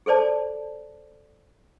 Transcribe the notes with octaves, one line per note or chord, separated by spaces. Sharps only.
G#4 A4 C5 D5 A5